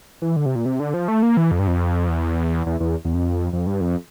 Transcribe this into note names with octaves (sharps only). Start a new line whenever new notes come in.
E3
D3
C3
A#2
C3
D3
F3
A3
A#3
E3
F2
G2
F2
E2
E2
E2
E2
F2
F2
G2
F2